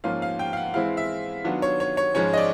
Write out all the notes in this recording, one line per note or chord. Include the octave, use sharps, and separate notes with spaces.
G#2 F3 A#3 C#4 F4 F5
F5
G5
F5
F#5
E3 G#3 C4 E4 F5
E5
D#3 F#3 B3 D4 F4
C#5
C#5
C#5
G#2 F3 G#3 C#4 C#5
D#5
D5